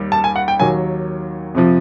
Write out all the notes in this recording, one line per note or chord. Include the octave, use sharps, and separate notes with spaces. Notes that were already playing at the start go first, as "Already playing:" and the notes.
Already playing: D#2 D#3 G3
A5
G#5
F#5
G5
D#2 D#3 F#3 G#5
F2 C3 F3